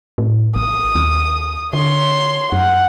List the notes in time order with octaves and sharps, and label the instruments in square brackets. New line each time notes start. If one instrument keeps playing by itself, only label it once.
[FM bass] A2
[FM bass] A1 [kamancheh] D#6
[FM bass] D#2
[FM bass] D3 [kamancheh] C#5 C6
[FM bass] F#2 [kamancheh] F#5